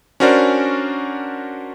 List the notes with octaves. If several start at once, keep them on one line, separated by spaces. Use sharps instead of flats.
C#4 D4 F#4 A#4 C5 D5